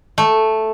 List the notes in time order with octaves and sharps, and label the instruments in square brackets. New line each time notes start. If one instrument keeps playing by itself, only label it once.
[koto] A3